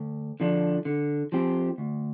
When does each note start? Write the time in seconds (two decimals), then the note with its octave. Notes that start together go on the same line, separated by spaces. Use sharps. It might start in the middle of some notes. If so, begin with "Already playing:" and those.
Already playing: D2
0.40 D3 F3 D4
0.85 D3
1.32 F3 C4 G4
1.78 D2